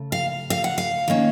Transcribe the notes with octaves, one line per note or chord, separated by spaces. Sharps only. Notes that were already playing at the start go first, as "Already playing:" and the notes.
Already playing: C#3 A3
F5
F5
F#5
F5
D#3 A#3 C#4